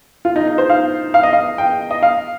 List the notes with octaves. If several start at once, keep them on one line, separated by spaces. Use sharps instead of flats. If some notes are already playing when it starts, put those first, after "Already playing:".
F4
D#4
D#4
C5
F5
F5
D#5
F5
G5
D#5
F5